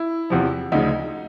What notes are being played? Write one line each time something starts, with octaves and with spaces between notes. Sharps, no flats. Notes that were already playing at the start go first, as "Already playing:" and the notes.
Already playing: E4
E2 C3 F3
D2 C#3 F3 D#4